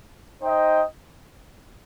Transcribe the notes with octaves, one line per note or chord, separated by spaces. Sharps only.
D#4 C5 D#5 G5